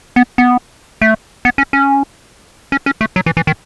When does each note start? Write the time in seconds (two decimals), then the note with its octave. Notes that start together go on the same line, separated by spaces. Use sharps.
0.16 B3
0.38 B3
1.01 A3
1.45 B3
1.58 C#4
1.73 C#4
2.72 C#4
2.86 C#4
3.01 A3
3.16 F#3
3.26 E3
3.37 E3
3.47 D#3